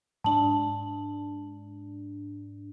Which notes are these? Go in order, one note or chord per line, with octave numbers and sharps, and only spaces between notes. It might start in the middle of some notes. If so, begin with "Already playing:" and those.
G#2 D4 A5 F#7